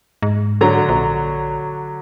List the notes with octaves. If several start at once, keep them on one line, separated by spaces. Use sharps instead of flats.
G#2
D3 F#3 A#5
A#1